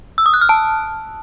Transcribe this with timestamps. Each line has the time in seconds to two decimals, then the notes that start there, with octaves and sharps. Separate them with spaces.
0.18 E6
0.26 D#6
0.34 F#6
0.41 F6
0.49 A5